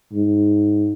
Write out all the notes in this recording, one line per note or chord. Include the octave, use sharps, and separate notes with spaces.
G#2